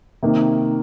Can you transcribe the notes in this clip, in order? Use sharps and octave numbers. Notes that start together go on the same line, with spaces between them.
C3 D#3 A#3